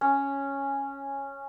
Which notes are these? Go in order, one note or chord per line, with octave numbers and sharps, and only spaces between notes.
C#4